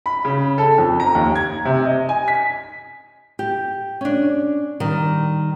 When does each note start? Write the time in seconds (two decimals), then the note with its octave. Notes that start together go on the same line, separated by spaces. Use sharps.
0.06 B5
0.25 C#3
0.58 A4
0.78 F2
1.00 A#5
1.15 D#2
1.35 G#6
1.65 C3
1.85 D#5
2.09 G#5
2.28 B6
3.39 G4
4.01 C#4 D4
4.80 D#3 G3